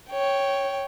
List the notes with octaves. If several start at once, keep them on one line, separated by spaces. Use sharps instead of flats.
C#5 G5